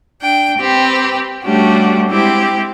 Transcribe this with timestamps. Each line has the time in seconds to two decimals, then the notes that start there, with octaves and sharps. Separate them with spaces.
0.22 D4 G5
0.59 C4 G4 B4
1.43 G3 A3 C#4 D4 F#4 G4
2.09 G#3 C4 E4 G4